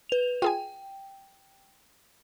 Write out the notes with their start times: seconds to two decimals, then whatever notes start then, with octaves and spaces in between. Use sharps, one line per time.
0.09 B4 F7
0.42 F4 G#4 G5 G#5